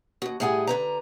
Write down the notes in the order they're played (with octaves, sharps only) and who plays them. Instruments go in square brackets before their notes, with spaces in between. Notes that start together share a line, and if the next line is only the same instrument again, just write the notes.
[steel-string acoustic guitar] D#2 F#4
A2 G3 G#4 F#5 G#5
D3 B4 A#5